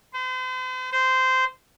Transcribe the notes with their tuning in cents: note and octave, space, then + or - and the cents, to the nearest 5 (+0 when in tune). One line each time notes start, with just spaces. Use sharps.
C5 -40
C5 -15